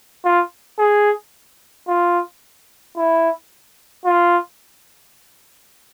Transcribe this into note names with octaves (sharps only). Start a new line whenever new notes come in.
F4
G#4
F4
E4
F4